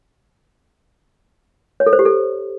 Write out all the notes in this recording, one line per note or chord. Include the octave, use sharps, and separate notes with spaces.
C#5
A4
C5
G4
A4